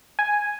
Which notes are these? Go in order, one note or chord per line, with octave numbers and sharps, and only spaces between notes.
G#5